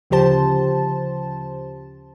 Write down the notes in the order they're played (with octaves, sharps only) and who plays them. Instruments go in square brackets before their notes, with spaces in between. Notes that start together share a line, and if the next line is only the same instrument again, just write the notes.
[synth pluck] D2 C#3 F3 G4 C5 A5